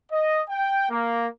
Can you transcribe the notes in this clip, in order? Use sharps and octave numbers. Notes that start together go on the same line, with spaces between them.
D#5
G5
A#3